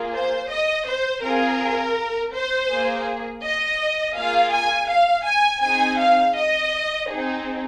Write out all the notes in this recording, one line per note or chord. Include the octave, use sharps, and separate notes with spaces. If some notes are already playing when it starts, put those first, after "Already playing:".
Already playing: A#3 F4 G#4
C5
D#5
C5
C4 F4 G#4 A#4
C5
A#3 G#4
D#5
A#3 F4 G#4 F5
G#5
F5
G#5
C4 D#4 G#4 G#5
F5
D#5
C4 D#4 G#4